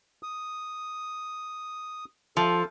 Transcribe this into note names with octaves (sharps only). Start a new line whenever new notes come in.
D#6
F3 A4